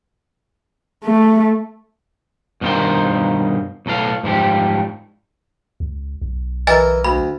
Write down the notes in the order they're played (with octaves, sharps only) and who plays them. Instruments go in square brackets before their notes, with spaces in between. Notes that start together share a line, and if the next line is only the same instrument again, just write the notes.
[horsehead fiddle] A3
[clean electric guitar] G2 B2 D#3 F4 A#4 C5
B1 A2 A4 F5
G#2 F3 G3 G4
[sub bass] C#2
B1
[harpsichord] E3 A#4 [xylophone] D#5 G#5 A6
[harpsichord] D2 [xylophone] B5